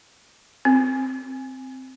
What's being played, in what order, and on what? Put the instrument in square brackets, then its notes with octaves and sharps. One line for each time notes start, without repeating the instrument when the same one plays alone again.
[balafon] C4